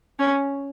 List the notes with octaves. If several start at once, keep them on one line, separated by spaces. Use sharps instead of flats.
C#4